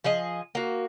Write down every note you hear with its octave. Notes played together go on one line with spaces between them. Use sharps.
F3 G#4 D#5
A#3 F#4